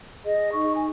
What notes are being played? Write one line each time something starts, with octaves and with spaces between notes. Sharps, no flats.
G#4 D#5
D#4 C#6
G#5